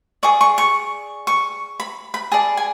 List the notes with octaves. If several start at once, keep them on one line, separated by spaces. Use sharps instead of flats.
G#4 D5 C#6
C#6
C#6
C#6
B5
B5
G#4 D5 A5
G#5